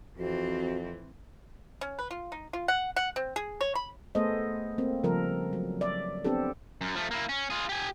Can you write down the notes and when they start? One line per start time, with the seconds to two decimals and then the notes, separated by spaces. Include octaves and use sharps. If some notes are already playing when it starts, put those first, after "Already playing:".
0.18 F2 E3 C4 F#4
1.81 C#4
1.99 B4
2.11 F4
2.32 D#4
2.53 F4
2.68 F#5
2.96 F#5
3.16 C4
3.36 G#4
3.61 C#5
3.75 B5
4.15 A3 B3 G#4 A4 C5 D#5
4.78 A#3 C4
5.04 C#3 F3 G3 A4 A#4
5.53 F#3
5.81 D5 E5
6.24 B3 C4 D4 G4 A4
6.81 F#2
6.96 F3 A3
7.11 A#3 E4
7.29 C#4
7.50 F4 G#4
7.69 G4 G#5